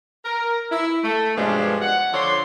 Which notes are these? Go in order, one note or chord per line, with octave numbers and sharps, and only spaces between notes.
A#4
E4
A3
G2 B2 F3 G#3 C#4 D4
F#5
D3 F3 A4 C#5 D5 C6